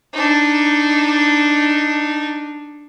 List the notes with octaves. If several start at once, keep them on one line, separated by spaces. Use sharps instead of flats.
D4 D#4